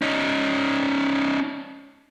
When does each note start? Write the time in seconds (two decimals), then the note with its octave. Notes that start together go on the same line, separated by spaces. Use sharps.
0.02 C#4 D#4